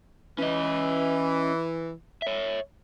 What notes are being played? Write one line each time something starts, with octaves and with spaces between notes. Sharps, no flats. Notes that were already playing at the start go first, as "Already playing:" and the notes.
E3 C#4 D#5
C#5 E5